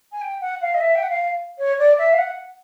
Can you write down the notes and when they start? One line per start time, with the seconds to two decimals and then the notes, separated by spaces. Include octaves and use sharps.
0.12 G#5
0.21 G5
0.40 F#5
0.61 F5
0.74 D#5
0.80 E5
0.95 G5
1.02 F#5
1.09 F5
1.58 C#5
1.78 D5
1.98 E5
2.13 F5
2.18 F#5